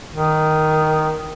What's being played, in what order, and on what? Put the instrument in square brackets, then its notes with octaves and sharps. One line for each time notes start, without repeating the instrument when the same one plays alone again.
[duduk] D#3